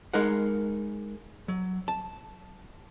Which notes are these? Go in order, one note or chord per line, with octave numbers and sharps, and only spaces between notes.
G#3 D#4 A#4 F#5
F#3
A5